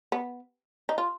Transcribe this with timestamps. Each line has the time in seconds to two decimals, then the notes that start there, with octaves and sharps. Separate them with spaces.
0.12 B3
0.89 D#4
0.98 F4